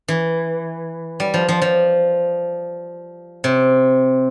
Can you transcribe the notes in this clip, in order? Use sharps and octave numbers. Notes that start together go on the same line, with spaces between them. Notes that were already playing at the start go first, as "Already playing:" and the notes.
E3
G3
F3
F3
F3
C3